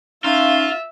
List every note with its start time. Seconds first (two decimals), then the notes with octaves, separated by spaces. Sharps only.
0.24 C#4 D#4 F4 E5 F5